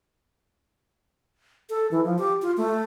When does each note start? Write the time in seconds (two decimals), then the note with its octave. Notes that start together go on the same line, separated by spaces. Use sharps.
1.70 A4
1.91 E3
2.05 F3
2.19 G4
2.42 F4
2.57 A3